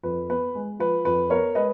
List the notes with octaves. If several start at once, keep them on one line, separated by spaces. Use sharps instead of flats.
F2 B4
B3 B4
G#3
F3 B4
F2 B4
B3 A#4 C#5
G#3 B4 D#5